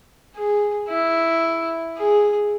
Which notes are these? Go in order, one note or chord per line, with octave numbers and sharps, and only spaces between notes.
G#4
E4
G#4